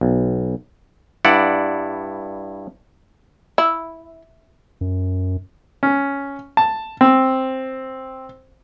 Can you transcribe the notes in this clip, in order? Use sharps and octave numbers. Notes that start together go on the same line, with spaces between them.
B1
G2 E4 D5 F#5
E4
F#2
C#4
A5
C4